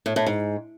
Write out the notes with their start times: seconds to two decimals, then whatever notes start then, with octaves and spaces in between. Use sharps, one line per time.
0.06 A2
0.16 A2
0.26 G#2